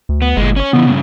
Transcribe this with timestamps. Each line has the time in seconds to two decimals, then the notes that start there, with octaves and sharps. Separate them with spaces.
0.09 D2
0.22 B3
0.37 G1 A#2 G#3
0.56 C#4 C#5
0.73 C#3 E3 B3
0.87 G2 C#3